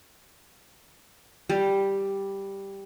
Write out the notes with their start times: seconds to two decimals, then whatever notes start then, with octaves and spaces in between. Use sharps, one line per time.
1.50 G3